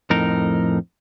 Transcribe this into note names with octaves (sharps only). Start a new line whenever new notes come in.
F2 A2 D#4 A#4